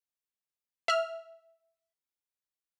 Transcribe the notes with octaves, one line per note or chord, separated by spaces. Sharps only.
E5 F6